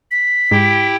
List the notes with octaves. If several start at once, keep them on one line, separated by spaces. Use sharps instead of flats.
B6
G#2 E4 G4 G5